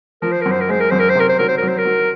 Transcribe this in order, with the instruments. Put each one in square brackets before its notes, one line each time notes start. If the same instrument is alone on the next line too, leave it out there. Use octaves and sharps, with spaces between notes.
[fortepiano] F3 [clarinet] A#4
[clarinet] C5
[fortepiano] F#2 [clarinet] A#4
[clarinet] C5
A#4
[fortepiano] G#3 [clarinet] C5
[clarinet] A#4
[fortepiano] F#2 [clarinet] C5
[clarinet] A#4
C5
[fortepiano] C3 [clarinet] A#4
[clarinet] C5
[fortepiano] F#3 [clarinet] A#4
[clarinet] C5
[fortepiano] F#3 [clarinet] A#4
[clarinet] C5
A#4
[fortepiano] F#3